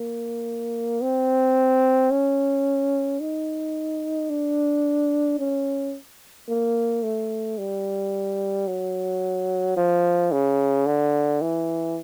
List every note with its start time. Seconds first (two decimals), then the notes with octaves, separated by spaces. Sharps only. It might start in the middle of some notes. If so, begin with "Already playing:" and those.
Already playing: A#3
1.01 C4
2.10 C#4
3.20 D#4
4.30 D4
5.39 C#4
6.48 A#3
7.03 A3
7.58 G3
8.67 F#3
9.76 F3
10.32 C#3
10.86 D3
11.41 E3